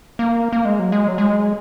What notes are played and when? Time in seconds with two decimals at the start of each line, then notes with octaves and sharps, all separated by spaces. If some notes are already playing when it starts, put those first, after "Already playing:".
0.19 A#3
0.52 A#3
0.65 G#3
0.79 F#3
0.92 G#3
1.08 F#3
1.18 G#3